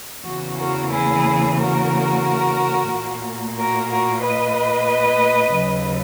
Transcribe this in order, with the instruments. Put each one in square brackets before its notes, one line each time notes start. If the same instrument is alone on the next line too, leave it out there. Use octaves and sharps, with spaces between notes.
[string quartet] E2 C#3 E3 A#3 F#4
F#4 A#4
E4 G#4
F#4 A#4
A#2 A#3
F#4 A#4
F#4 A#4
B4 D#5
D#2 C#3 F#3